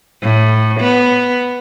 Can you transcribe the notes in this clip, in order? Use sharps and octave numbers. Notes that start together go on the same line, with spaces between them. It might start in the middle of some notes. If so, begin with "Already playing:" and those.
A2
B3